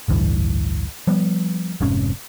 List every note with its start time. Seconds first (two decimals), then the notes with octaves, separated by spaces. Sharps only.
0.08 A1 D2 G2 E3
1.07 F3 G3 B3
1.81 F1 G#2 C3 C#4